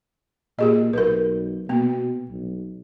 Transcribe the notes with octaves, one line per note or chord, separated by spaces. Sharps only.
A#2 G4 G#4 D#5
B1 A#4 B4
B2 A#3 B3
B1